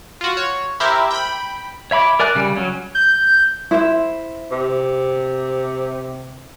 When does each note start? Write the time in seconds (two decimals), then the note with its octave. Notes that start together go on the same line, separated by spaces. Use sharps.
0.21 F4 F#4
0.37 C#5
0.80 E4 G4 A#4 C5 E5
1.11 G5 B5
1.91 C#5 E5 B5 D6
2.20 A#4 D5 G#5 D6 F#6
2.35 C#3 G3
2.56 F#3 C#4
2.95 G6
3.71 E4 C5 E5
4.51 C3